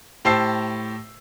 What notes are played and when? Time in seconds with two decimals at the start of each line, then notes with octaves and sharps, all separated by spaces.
0.25 A2 G4 C5 A5 E6 C7